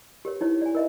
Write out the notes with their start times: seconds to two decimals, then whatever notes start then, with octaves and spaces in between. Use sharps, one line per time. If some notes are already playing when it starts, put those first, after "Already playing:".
0.25 G4 A#4 C#5
0.41 D#4 E4 C#5
0.62 D5 G#5
0.75 A#4 D#5 E5